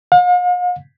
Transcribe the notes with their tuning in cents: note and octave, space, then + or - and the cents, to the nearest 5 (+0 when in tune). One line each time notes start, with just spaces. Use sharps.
F5 +45